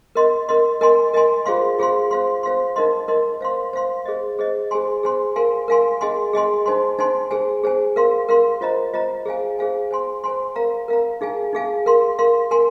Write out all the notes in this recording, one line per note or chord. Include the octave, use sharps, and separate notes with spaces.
A#4 D#5 C6
A#4 D#5 C6
A#4 D#5 G#5 C6
A#4 D#5 G#5 C6
F4 G#4 C5 F5 C6
F4 G#4 C5 F5 C6
C5 F5 C6
C5 F5 C6
D#4 A#4 D#5 C6
D#4 A#4 D#5 C6
C5 F5 C6
C5 F5 C6
G#4 C5 D#5
G#4 C5 D#5
G#4 C5 G#5 C6
G#4 C5 G#5 C6
A#4 F5 G#5 C6
A#4 F5 G#5 C6
G#4 D#5 G#5 C6
G#4 D#5 G#5 C6
D#4 C5 G#5 C6
D#4 C5 G#5 C6
G#4 C5 G#5
G#4 C5 G#5
A#4 F5 C6
A#4 F5 C6
F4 C5 D#5 A#5
F4 C5 D#5 A#5
G#4 C5 F5 G#5
G#4 C5 F5 G#5
C5 G#5 C6
C5 G#5 C6
A#4 F5 A#5
A#4 F5 A#5
D#4 G#4 F5 G#5
D#4 G#4 F5 G#5
A#4 F5 C6
A#4 F5 C6
A#4 G#5 C6